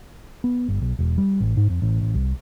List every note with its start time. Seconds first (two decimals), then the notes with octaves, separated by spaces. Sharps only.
0.44 B3
0.68 G1
0.82 B1
0.99 E1
1.18 G3
1.40 A1
1.57 G#2
1.70 F2
1.82 A1
2.01 A1
2.15 C2